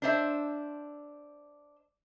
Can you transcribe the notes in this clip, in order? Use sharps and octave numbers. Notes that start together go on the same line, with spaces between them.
D4 C5 E5